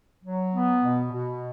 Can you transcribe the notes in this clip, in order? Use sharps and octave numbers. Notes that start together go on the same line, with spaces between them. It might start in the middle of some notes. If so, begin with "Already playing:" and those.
F#3
B3
B2
B2